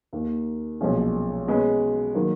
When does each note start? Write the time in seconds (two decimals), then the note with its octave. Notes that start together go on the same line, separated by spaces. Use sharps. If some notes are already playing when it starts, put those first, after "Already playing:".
0.13 D#2 D#3 A#3
0.81 B1 A#2 F3 G#3 C#4
1.47 B2 G#3 C#4 G#4 B4
2.15 D#3 F#3 A#3